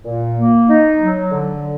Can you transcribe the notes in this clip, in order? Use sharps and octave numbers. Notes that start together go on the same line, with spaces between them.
A#2
A#3
D#4
F#3
D3